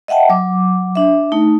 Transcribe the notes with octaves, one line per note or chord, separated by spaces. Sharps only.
D#5 E5 F#5 G5 A5
F#3 D6
D4 E5
A3 D#4